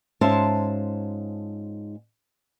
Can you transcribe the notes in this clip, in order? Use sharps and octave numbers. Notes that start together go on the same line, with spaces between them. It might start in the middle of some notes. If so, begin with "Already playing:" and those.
G#2 C#4 F4 C5 E5 A5